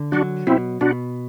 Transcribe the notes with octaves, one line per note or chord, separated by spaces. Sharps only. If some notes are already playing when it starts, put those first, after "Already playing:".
Already playing: D3
F#3 D4 F#4
B2 C4 E4
B2 D4 F#4